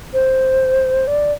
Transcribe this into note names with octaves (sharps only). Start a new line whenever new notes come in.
C5
D5